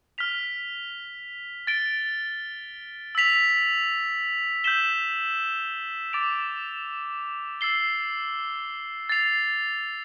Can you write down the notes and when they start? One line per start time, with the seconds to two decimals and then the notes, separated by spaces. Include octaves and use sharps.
0.18 F6 B6 F7
1.67 A6 D7 G7
3.15 E6 B6 F7
4.64 E6 G6 B6 E7 G7
6.13 D6 A6 D7 F7
7.61 E6 A6 C7 G7
9.09 A6 C7 F7